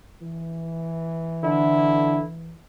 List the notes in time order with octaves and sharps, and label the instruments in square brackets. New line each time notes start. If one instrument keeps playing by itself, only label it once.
[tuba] E3
[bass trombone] D3 [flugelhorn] E4